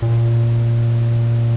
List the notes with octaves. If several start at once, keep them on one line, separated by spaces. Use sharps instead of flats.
A#2